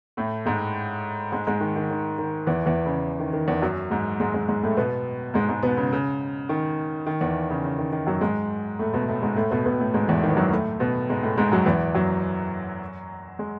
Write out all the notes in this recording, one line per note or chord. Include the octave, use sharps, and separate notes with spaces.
A2 A3
G#2 G#3
G#2 G#3
G#2 G#3
D#3
D#3
D#3
D#3
E2 E3
E2 E3
C#3
D#3
D#3
E2 E3
F#2 F#3
G#2 G#3
G#2 G#3
G#2 G#3
G#2 G#3
A2 A3
B2 B3
G#2 G#3
G#2 G#3
B2 B3
C#3
C#3
D#3
D#3
E2 E3
C#3
C#3
D#3
D#3
F#2 F#3
G#2 G#3
A2 A3
B2 B3
A2 A3
G#2 G#3
A2 A3
B2 B3
B2 B3
A2 A3
G#2 G#3
E2 E3
D#3
E3
F#2 F#3
A2 A3
B2 B3
G#2 G#3
A2 A3
G#2 G#3
F#2 F#3
E2 E3
F#2 F#3
G#3